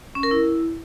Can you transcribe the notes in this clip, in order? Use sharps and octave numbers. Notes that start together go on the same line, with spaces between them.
C#4
A#4
E4